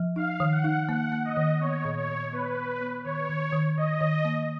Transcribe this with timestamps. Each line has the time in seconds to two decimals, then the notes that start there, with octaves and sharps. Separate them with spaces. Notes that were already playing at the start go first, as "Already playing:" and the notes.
Already playing: F3
0.16 D#4 F5
0.40 D#3
0.52 F#5
0.64 D#4
0.89 A#3 F#5
1.12 A#3
1.25 D#5
1.37 D#3
1.61 B3 C#5
1.85 A#2
1.97 C#5
2.09 A#2
2.32 B3 B4
2.57 B3
2.81 B3
3.04 D#3 C#5
3.29 D#3
3.53 D#3
3.77 D#3 D#5
4.01 D#3
4.25 A#3